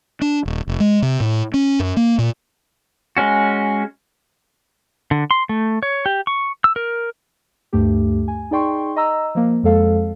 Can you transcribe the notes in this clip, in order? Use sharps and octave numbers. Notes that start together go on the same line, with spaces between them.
D4
D#1
F1
G#3
C3
A2
C#4
F#2
A#3
A#2
G#3 C#4 F#4
D3
C6
A3
C#5
G4
C#6
E6
A#4
D2 G2 A3 G4
G#5
D#4 G#4 D5 G5 C6 C#6
D#5 A#5 E6
F3 A#3
F2 F3 G#3 A4 F5